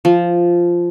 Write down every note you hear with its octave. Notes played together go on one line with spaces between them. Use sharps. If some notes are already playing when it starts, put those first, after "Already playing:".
F3